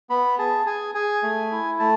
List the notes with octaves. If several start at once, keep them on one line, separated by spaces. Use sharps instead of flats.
B3 B5
G#4 A5
G#4 G#5
G#4 G#5
A3
E4
A3 A5